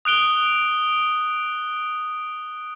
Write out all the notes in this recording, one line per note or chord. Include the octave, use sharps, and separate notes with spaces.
D#6 F#6 D7 G7